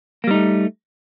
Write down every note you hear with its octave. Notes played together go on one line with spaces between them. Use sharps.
G3 A3 A#3 D#4